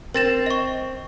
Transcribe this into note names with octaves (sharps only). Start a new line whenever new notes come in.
C4 A#4 A6 E7
D#5 C#6